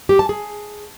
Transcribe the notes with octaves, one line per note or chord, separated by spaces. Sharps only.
G4
A5
G#4